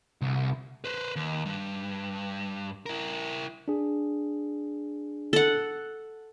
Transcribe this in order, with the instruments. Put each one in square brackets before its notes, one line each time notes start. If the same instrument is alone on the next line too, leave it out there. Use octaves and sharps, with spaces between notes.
[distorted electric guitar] C2
[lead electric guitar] B4 C5
D#2
G2
E4 A#4
[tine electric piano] D4 G#4
[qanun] A4 F#5